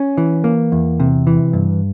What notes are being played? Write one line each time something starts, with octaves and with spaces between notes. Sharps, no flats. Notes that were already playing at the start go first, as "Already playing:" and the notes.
Already playing: C#4
E3
A#3
E2
C3
E3
G2